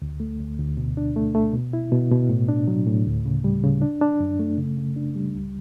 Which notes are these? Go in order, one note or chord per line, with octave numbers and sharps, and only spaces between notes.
D2
A3
D2
D2
B2
D4
A3
A3
B2
E4
B2
B2
A2
D4
F#3
A2
D2
C#3
G3
C#3
D4
D4
F#2
A3
C#3
C#3
D4
G3
C#2